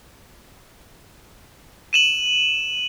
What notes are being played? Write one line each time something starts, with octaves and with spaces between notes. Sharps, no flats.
D#7 E7 F#7